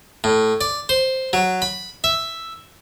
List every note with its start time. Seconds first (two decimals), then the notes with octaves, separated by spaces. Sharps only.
0.24 A2
0.61 D5
0.89 C5
1.33 F#3
1.62 B5
2.04 E5